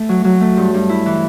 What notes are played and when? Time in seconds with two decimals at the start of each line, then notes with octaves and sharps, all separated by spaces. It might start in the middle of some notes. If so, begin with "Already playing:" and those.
Already playing: A3
0.09 F#3
0.24 F#3
0.41 A3
0.57 G2
0.74 G2
0.89 E4
1.06 E3